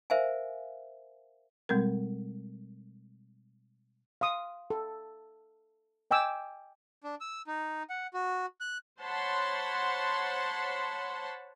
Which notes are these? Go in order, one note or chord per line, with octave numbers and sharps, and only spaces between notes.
A#4 C5 E5 F5 G#5
B2 G3 G#3 C4 A#4
F5 C6 D#6
A4
D#5 G5 G#5 D6 E6
D4
E6
D#4
F#5
F#4
F#6
C5 C#5 F#5 A5 B5 C6